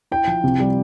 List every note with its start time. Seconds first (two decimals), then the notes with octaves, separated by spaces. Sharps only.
0.11 E4 G5
0.27 F3
0.44 C3
0.60 G3